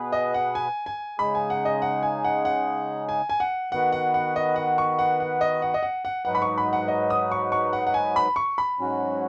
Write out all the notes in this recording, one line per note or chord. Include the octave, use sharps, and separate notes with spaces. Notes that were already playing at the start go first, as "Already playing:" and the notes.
Already playing: B2 B3 G#4 B4
D#5
F#5
G#5
G#5
C#3 G#3 D#4 G#4 B5
G#5
F#5
D#5
F#5
G#5
F#5
F#5
G#5
G#5
F#5
D#3 B3 F#4 B4 F#5
F#5
F#5
D#5
F#5
C#6
F#5
F#5
D#5
F#5
D#5
F#5
F#5
G#2 F#3 D#4 F#4 B4 F#5
B5
C#6
B5
F#5
D#5
D#6
C#6
C#6
F#5
F#5
G#5
B5
C#6
B5
G#2 F#3 C#4 F#4